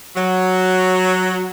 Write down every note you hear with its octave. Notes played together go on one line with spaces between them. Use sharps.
F#3